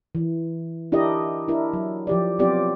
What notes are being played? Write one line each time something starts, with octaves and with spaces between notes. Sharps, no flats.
E3
D4 E4 G4 A#4 D#5
D4 E4 A#4
F#3
F3 G4 D5
F#3 B3 C4 F4 G4 D5